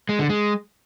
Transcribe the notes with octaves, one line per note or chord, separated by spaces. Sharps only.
G#3
D3
G#3